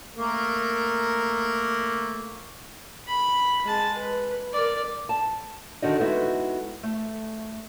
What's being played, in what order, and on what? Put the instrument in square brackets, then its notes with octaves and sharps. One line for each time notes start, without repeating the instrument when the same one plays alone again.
[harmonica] A3 A#3 A#4
[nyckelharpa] B5
G#3 A5
B4
A#4 D5
[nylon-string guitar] A5
D3 D#3 D#4 F#4 D5 D#5
G#3 B3 D#4 E4 F#4 A4
A3